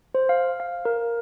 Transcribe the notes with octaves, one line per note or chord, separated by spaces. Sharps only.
C5
F5
F5
A#4